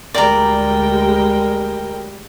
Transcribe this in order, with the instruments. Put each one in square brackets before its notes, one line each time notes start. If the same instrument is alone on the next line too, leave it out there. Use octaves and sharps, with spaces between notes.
[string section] D2 G3 G#3 [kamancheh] A#4 G5 [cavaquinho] D5 A#5